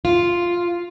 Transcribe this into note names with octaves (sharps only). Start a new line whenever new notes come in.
F4